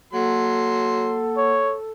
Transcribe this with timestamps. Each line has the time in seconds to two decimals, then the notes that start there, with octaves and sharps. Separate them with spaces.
0.13 F#3 A#3 A4 F#5 C6
1.37 C#5